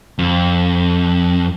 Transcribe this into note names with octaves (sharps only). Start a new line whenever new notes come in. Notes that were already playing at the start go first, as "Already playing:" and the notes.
F2